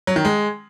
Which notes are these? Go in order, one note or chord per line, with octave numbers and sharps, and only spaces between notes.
F#3
D#3
G#3